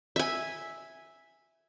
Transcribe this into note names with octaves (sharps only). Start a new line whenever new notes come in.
E5 G#5